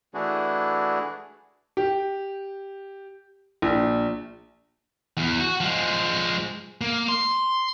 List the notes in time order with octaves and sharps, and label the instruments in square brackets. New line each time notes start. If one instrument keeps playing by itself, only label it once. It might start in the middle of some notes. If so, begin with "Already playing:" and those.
[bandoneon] E3 A3 D4 E4 F#4 G#4
[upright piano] G4
A#1
[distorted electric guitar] E2
F#4
F3 G#3
A#3
C6